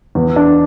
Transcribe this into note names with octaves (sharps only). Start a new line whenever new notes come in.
E2
D4